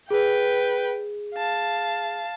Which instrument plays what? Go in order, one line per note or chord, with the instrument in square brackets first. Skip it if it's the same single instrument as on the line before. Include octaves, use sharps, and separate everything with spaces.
[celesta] G#4 [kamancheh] B4 G5
[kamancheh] F5 A5